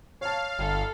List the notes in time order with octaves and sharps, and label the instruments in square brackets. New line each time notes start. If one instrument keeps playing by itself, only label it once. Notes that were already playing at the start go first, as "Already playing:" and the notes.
[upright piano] C#5 A5 [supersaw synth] F5
[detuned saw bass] G1 [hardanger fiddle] A4